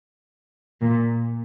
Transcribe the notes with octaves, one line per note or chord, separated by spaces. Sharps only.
A#2